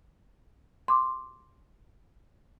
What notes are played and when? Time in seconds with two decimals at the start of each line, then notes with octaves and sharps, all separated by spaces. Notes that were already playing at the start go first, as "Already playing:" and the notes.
0.88 C6 D6